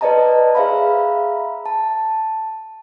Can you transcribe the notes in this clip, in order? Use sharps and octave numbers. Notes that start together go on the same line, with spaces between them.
B4 C5 D5 D#5 A5 A#5
G#4 C5 E5 F5 A#5 B5
A5